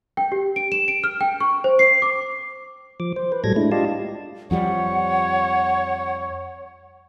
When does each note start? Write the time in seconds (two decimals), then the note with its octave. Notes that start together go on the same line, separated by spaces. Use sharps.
0.17 G5
0.32 G4
0.56 D7
0.72 E7
0.88 D7
1.04 F6
1.21 G5
1.40 C#6
1.64 C5
1.79 C7
2.02 D6
3.00 F3 D6
3.16 C5
3.32 B4
3.44 A2 F#3 G3 A4 G#6 A#6
3.56 G#3 A3 D4 E4
3.72 F4 G4 D5 D#5 F5 A5
4.51 F2 F3 G3 C#5 F#5